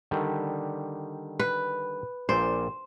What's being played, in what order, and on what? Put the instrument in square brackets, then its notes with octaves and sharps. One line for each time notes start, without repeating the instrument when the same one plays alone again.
[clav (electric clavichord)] D3 D#3 G3
[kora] B4
[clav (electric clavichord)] A#1 A#2 D5 [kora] C5